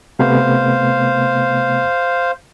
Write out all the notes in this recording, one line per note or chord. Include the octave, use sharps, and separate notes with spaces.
C3 A3 B3 C5 F5